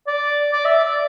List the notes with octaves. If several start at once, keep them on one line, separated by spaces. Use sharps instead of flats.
D5
D5
E5
D5